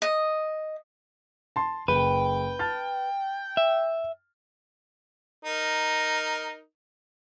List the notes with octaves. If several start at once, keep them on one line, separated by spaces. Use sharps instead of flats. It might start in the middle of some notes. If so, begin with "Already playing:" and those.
D#5
A5 C6
F#1 B4 G5
A5 F6 A6
E5
D#4 A#4